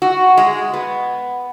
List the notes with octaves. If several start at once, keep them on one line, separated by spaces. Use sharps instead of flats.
F#4
G#3
B3